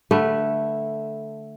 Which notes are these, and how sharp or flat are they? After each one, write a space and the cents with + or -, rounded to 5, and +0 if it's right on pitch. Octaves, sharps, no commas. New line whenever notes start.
D3 +0 A3 +0 B4 -10